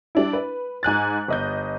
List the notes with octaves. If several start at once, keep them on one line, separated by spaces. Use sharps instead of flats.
G3 D4 E4
B4
G#2 G#5 F#6 A6
G1 D#5 G6